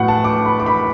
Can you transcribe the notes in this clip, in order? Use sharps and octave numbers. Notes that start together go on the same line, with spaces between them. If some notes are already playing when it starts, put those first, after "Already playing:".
Already playing: A2 F#3 B3 F#5
A5
D6
B5
D6
B5